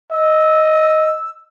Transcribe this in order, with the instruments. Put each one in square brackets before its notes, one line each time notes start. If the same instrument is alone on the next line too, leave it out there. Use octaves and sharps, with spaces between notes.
[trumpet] D#5 [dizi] E6